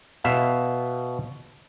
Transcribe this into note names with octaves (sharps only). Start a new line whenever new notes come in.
B2 E5 F5